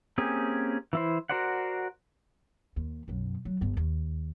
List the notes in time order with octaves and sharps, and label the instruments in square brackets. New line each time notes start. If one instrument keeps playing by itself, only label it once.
[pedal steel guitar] A#3 C4 C#4 G4 G#4
E3 E4 C5
F#4 A#4 C5 D5 F#5
[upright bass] D#2
B1 F#2
F#3
G1 G2
D#2